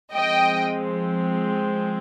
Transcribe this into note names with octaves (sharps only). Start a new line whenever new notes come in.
F3 G#3 C4 D#5 G5